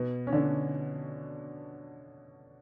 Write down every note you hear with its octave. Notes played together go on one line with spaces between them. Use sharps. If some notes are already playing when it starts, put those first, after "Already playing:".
Already playing: B2 B3
C#4
D3 D4